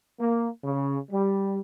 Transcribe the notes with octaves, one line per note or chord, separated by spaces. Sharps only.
A#3
C#3
G3